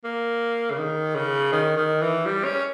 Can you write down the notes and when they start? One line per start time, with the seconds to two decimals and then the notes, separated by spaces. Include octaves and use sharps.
0.04 A#3
0.71 C#3
0.78 D#3
1.15 C#3
1.52 D#3
1.77 D#3
2.02 E3
2.26 G3
2.45 C#4